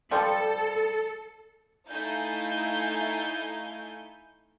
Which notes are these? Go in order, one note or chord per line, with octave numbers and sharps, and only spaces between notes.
F3 G3 A4
A3 D#4 E4 F5 G#5 G6